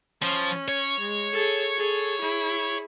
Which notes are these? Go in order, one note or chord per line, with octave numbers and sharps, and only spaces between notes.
F3 C#4
C#5
G#3
G#4 A4
G#4 A4
E4 G#4